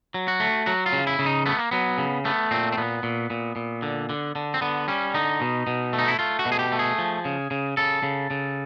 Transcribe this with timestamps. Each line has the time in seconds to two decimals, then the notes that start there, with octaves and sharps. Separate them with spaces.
0.14 F#3
0.28 F#4
0.40 A3
0.66 F#3 F#4
0.86 F4
0.93 C#3
1.07 E4
1.19 C#3
1.26 D#4
1.46 A3 B3
1.59 A#3
1.71 F#3 B3
1.98 C#3
2.25 A3 B3
2.51 A#2 C4
2.72 C4
2.77 A#2 B3
3.03 A#2
3.30 A#2
3.56 A#2
3.82 D3
4.09 D3
4.35 D3
4.54 C4
4.61 D3 B3
4.88 G3 C#4
5.14 D3 D#4
5.41 B2
5.67 B2
5.93 A3
5.99 D#4
6.08 E4
6.19 A3 F4
6.39 F#4
6.46 B2
6.52 G#4
6.59 G4
6.72 A3
6.79 G#4
6.98 F3
7.25 C#3
7.51 C#3
7.77 C#3 A4
8.03 C#3
8.30 C#3